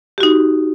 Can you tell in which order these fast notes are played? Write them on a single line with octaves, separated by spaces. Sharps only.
G4 F#4 D#4